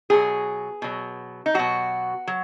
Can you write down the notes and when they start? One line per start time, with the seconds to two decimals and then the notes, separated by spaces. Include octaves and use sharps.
0.10 B2 F#3 G#4
0.82 B2 F#3
1.46 D#4
1.54 B2 F#3 F#4
2.27 F#3